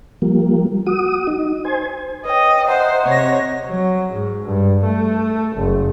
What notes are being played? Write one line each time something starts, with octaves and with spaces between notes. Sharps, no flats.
F3 G3 A#3
F#4 D#6
D#4
C5 G#5
B4 C#5 D#5 G5
C5 D#5 E5 F#5 A#5
C3 C#5 A#6
F#3
G#2
G2
A3
F#1